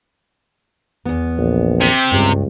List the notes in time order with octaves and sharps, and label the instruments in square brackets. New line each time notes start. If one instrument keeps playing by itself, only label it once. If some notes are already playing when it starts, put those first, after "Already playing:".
[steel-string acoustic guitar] E2 B3
[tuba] A#1
[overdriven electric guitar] C3
[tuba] C#2 [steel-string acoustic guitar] G2